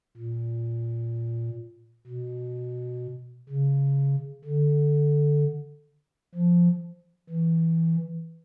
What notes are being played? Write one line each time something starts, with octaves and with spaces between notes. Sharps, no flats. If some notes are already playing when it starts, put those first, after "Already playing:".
A#2
B2
C#3
D3
F3
E3